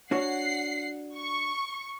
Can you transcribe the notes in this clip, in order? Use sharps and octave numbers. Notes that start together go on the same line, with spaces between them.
D4 F#4 C#5 F#5 C7
C#6